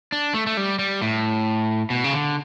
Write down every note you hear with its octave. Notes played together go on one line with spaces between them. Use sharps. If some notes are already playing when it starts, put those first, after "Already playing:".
D4
A3
A3
G3
G3
A2
B2
C#3
D3